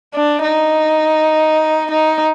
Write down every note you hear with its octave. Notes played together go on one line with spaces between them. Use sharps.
D4
D#4
D#4